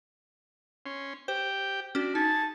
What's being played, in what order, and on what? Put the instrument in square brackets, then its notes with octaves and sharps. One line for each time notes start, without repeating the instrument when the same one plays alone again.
[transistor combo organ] C#4 C6
[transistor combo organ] G4 G5 [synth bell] C5
[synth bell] C#4 F#4 [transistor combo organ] D4
[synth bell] D#4 [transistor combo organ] G#4 [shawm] A5